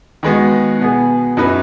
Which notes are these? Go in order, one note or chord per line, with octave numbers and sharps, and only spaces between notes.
D#3 G#3 B3 F#4
B2 B3 G#4
F#2 F#3 D#4 B4